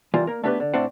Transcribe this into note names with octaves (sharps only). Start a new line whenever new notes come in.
E3 G3 A#3 F4
A#3 A#4
A3 B3 D4 G4 A4 B4
D3
A2 A3 C4 D4 C5 F#5